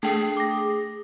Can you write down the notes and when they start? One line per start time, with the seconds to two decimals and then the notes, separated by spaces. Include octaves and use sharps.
0.03 A3 D4 G#4 G5 C7
0.37 D6 A#6